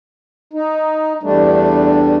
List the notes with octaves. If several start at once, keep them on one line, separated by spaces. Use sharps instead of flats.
D#4
E2 G3 A3 D4